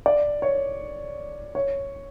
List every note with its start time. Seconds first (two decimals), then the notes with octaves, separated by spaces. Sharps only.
0.06 D5
0.42 C#5
1.55 C#5